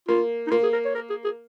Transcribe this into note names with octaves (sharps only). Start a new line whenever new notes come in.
A#3 F4
D#4
A#3 F4
G#4
A#4
C#5
A#4
G#4
G#4